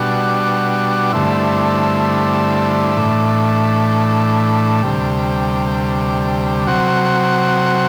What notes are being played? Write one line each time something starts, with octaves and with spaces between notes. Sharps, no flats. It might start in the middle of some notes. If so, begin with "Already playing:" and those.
Already playing: B2 G3 D4 F#4
G2 D3 A3 C4 E4
A2 E3 A3 D4
D2 C3 G3
C3 F#3 C4 F#4